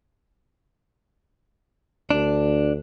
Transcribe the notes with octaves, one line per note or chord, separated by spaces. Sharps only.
D2 D4